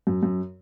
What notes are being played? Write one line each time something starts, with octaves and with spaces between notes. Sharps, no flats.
F#2
F#2